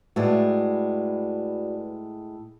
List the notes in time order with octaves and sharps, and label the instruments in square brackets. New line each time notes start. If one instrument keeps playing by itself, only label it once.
[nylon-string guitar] A2 G#3 A3 [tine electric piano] F#4 B4 D5